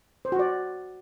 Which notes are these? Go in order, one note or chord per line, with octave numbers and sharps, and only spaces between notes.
C5
F#4
D5